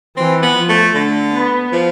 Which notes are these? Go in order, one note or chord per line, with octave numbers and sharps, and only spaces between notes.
E3 C4
B3
F3
A3
D3 A3
B3
F3